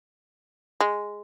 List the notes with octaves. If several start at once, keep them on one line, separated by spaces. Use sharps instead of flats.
G#3